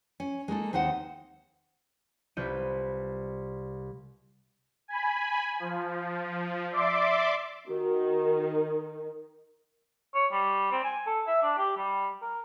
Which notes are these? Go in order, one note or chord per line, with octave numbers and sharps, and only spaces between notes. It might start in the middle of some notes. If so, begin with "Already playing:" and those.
C#4
G#3 A#3 D#4 A4
D#2 C4 D#4 C5 F#5
C2 F4 B4 G6 D#7
G#5 B5
F3
D5 E5 C6 D6
D#3 F#4
C#5
G3
C4
G#5
A4
E5
D4
G4
G3
A#4